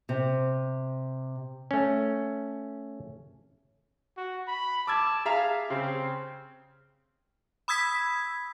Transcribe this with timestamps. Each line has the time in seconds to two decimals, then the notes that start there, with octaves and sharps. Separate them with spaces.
0.09 C3
1.71 A3 C#4
4.17 F#4
4.48 B5
4.87 A5 D6 E6 G#6
5.25 G#4 E5 F5 A#5
5.70 C#3 C4
7.68 B5 D#6 E6 G#6 B6